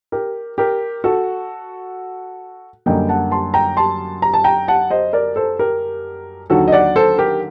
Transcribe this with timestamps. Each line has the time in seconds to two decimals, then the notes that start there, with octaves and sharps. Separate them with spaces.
0.12 G4 A#4
0.58 G4 A#4
1.04 F#4 A4
2.86 F#2 D3 G3 A#3 D#5 G5
3.09 F#5 A5
3.31 A5 C6
3.54 G5 A#5
3.77 A5 C6
4.22 A#5
4.34 A5
4.44 G5 A#5
4.68 F#5 A5
4.91 C5 D#5
5.13 A#4 D5
5.36 A4 C5
5.59 G4 A#4
6.50 D#2 D3 F#3 F#4 A4
6.68 D#5
6.72 D5 F#5
6.96 A4 C5
7.18 G4 A#4